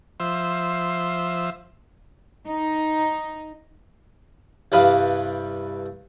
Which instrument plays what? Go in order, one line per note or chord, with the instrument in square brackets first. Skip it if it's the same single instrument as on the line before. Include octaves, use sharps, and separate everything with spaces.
[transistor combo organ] F3 C5 E5
[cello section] D#4
[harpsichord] C2 G2 G3 B4 F5